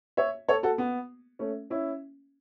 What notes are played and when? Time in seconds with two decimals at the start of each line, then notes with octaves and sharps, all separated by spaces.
0.17 C#5 E5
0.48 A4 C#5
0.63 F#4 A4
0.78 B3
1.39 A3 C#4
1.70 C#4 E4